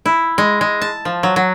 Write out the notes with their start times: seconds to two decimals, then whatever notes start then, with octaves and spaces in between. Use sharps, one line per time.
0.06 E4
0.38 G#3
0.61 G#3
0.82 A5
1.05 F3
1.23 F#3
1.36 F#3